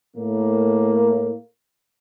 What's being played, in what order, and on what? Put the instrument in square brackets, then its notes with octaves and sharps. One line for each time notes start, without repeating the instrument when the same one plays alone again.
[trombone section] A2 A#3